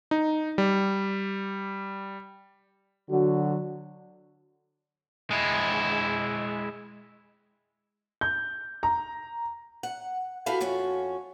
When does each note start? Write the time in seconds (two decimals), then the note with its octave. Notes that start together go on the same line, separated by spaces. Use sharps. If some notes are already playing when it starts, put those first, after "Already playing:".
0.11 D#4
0.58 G3
3.11 D3 F#3 F#4
5.31 G#3 E4
8.21 G6
8.83 A#5
9.83 F#5
10.46 E4 F#4 G4 A4 B4 F5
10.61 F2 C#4 F4 F#4